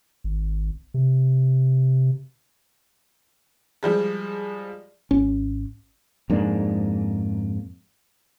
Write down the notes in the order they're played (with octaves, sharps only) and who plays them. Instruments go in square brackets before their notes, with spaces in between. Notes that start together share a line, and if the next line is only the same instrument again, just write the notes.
[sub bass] G#1
C3
[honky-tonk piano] F3 G3 G#3
[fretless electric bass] G#1 C#4
F2 G#2 A#3 D4